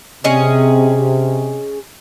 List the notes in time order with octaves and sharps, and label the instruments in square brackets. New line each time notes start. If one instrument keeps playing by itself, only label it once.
[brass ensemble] C3 [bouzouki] C#4 G#4 D#5